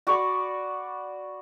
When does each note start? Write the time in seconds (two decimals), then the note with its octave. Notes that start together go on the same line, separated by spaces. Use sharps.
0.07 F#4 D5 B5 C#6